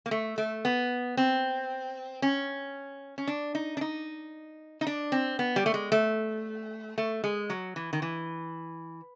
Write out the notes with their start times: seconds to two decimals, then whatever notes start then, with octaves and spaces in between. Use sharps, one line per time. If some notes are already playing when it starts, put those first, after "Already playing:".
0.06 A#3
0.11 A3
0.38 A3
0.65 B3
1.17 C4
2.22 C#4
3.18 C#4
3.27 D4
3.55 D#4
3.77 D4
3.81 D#4
4.81 D#4
4.87 D4
5.12 C4
5.39 B3
5.56 G3
5.66 A3
5.74 G#3
5.92 A3
6.98 A3
7.24 G#3
7.50 F#3
7.76 E3
7.93 D#3
8.02 E3